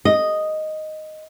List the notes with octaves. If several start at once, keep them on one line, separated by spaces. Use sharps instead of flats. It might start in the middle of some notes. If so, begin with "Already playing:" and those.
D#5